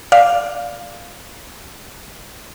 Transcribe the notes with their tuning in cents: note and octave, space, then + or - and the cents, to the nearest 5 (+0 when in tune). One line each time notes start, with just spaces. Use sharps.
D5 +0 F5 +0